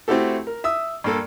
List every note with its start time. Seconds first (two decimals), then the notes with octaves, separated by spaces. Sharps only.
0.08 A3 C4 E4 F#4 G4 A4
0.47 A#4
0.64 E5 D#6 E6
1.04 G2 A#3 A4